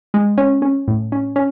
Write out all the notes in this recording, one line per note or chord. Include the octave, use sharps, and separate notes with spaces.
G#3
C#4
C#4
A2
C#4
C#4